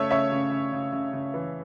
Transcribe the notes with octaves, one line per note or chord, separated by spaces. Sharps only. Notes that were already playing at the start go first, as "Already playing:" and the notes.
Already playing: C#3 A3 C#5 E5
C#3 C#5 E5
C#3
C#3
C#3
C#3
C#3
E3